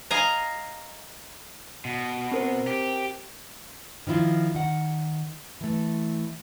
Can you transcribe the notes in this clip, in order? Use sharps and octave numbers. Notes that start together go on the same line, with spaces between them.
D#5 F5 G#5 A#5
B2
C4 A#4 C5
G4
D#3 F3 E4 F4
D#3 F#5
E3 A3